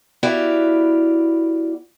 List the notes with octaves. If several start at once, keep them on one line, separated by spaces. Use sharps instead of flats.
B3 E4 F#4 G4 D5 F5